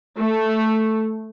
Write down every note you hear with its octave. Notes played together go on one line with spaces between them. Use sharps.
A3